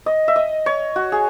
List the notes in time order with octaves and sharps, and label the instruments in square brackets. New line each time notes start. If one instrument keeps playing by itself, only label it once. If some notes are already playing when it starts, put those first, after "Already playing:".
[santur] D#5
E5
D#5
C#5
F#4
G#4